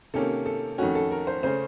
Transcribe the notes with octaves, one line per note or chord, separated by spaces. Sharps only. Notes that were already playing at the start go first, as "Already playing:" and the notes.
C3 D#3 A#3 C#4 A4
A4
F2 D#3 A3 C#4 F#4
A4
A#4
C5
C#3 A3 C#4 C5